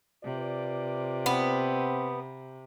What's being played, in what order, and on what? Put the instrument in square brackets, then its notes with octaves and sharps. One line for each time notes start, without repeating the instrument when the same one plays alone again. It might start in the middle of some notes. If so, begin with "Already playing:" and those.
[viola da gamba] C3 [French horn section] F4 B4 D5
[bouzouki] B3 [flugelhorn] C4